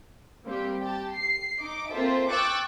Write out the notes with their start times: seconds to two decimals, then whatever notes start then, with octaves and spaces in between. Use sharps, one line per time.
0.45 G3 A#3 C4 G4
0.80 G4 A5
1.14 C7
1.61 D#4 D6
1.92 A#3 C4 F4 A4 C5 E5
2.30 G5 C#6 D6 E6 F#6 A6